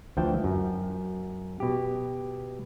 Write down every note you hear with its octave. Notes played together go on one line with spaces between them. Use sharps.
D2 E3 F3 G5 A5
F#2
B2 G4